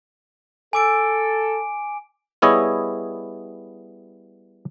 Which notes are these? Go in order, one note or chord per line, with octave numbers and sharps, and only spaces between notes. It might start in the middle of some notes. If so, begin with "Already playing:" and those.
A4 G#5 D6 D7
G3 B3 E4 G#4 C#5 D#5